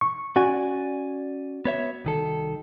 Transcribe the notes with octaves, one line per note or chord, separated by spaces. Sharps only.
C#6
C#4 F#4 D5 G#5
B3 C#5 E5
C2 D#3 A4